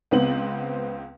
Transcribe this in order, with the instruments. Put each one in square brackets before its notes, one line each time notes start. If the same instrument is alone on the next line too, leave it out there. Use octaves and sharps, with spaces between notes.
[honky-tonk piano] C#2 B3 C4 F#7